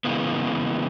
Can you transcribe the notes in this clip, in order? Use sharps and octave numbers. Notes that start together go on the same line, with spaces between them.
C#3 E3 G#3 A#3 B3